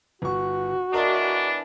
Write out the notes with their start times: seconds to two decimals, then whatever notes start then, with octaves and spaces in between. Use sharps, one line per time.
0.22 G1 F#4 C#6
0.94 E2 E3 D4 A#4 D#5